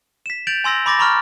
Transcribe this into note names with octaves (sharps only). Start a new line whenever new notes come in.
B6 E7
G6 A6 D7 F7 F#7
G#5 C6 E6 A#6 F#7
B5 C6 D6 A6 A#6
A#5 B5 C#6 D6 F6